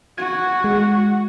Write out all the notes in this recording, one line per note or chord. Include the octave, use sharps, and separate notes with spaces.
F#4 G#6
G#3